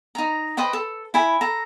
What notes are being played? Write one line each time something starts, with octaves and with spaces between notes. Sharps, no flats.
D#4 A#5
B4 C5 D#5 G5
A4
E4 G#5 B5
A4 A#5